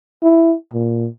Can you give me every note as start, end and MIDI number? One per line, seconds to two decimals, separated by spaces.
0.23 0.55 64
0.73 1.07 46